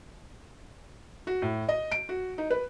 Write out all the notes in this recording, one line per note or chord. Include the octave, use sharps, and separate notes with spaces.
F#4
A2
D#5
D7
F#4
D#4
B4